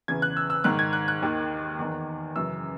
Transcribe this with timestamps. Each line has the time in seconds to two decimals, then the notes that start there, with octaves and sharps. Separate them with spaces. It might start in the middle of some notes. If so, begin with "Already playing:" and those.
0.08 E2 C#3 E3 G#6
0.22 F#6
0.37 E6
0.50 E6
0.64 G#2 D#3 F#6
0.79 G#6
0.93 F#6
1.08 F#6
1.22 D#2 D#3
1.79 E2 D#3
2.36 F#2 C#3 E3 E6